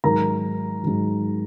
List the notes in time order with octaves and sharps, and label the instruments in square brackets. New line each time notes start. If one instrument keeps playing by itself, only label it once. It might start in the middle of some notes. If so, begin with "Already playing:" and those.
[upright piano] G#2 D#3 F#3 A#4 A#5
G#2 D#3 F#3